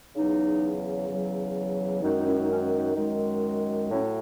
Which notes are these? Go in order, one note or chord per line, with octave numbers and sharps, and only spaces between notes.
E2 C#3 F#3 D#4
E2 C#3 F#3
F#2 D#3 G#3 D#4
D#4
C#4 E4
D#4
C#4
D#4
F#2 D#3 G#3
A2 F#3 A3 C#4 E4